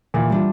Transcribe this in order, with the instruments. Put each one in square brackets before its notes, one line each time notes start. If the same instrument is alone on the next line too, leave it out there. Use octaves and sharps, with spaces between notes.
[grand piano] A#2 [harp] E3
[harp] G3 D4 F4